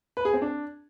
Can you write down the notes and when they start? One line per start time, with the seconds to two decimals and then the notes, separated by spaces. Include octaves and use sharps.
0.17 B4
0.25 G#4
0.33 C4
0.42 D4